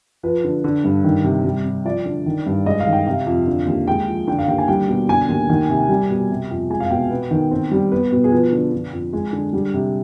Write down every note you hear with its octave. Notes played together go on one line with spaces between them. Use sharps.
F3 B4
D3
D3
G2
D#3
C3
G3
C3
F3 D5
D3
D#3
G2
G#3 D#5
F5
D#3
G5
C3 F5
F2
D3
D#2
G#3 G5
F3
D3 G5
F5
D#2 G5
G#5
G3 G5
B2
D3 G#5
D#2
D#3
C3
G3
B2
C3
F2
G#3 G#5
F5
B2 G5
B3
D#3
C4
G3
B3 B4
B2
G#4
F3 B4
D3
D3
F2
G#3 G#4
D3
G3
C3